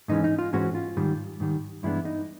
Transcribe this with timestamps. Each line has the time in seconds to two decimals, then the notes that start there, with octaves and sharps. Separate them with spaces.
0.08 G#2 E3 G#3 C#4 D#4
0.24 D#4
0.39 F4
0.53 G#2 E3 G#3 C#4 F#4
0.75 F4
0.97 G#2 D#3 G3
1.40 G#2 D#3 G3
1.83 G2 E3 G#3 B3 D4 E4
2.05 D#4